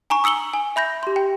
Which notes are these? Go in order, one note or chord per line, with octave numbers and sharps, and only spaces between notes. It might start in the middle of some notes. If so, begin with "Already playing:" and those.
G#5 A#5 C#6
D#6 E6 C#7 F#7 G7
G#5
E5 B5 G6 A#6
G4 C6
G5